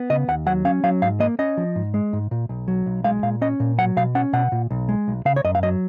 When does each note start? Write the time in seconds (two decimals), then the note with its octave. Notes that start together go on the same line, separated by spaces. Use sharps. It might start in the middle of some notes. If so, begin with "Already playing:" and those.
Already playing: B3
0.10 C#3 D#5
0.28 D#2 F#5
0.46 F#3 F#5
0.65 C#4 F5
0.84 F#3 F5
1.02 G#2 F5
1.20 A#3 D#5
1.39 C#4 D#5
1.57 F3
1.76 G#2
1.94 G#3
2.13 G#2
2.31 A#2
2.49 B1
2.68 F#3
2.86 B1
3.04 G#3 F5
3.23 A#2 F5
3.42 C#4 D#5
3.60 A#2
3.78 F#3 F#5
3.97 B2 F5
4.15 C#4 F#5
4.33 B2 F#5
4.52 A#2
4.71 B1
4.89 G#3
5.08 B1
5.25 C#3 F5
5.36 C#5
5.44 F#2 D#5
5.55 F5
5.63 F#3 D#5